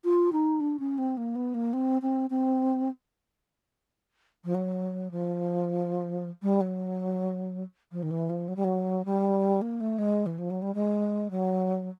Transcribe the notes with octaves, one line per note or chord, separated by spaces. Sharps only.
F4
D#4
D4
C#4
C4
A#3
B3
A#3
C4
C4
C4
F3
F#3
F3
G3
F#3
F3
D#3
E3
F3
F#3
G3
F#3
G3
A#3
A3
G#3
E3
F3
F#3
G3
G#3
F#3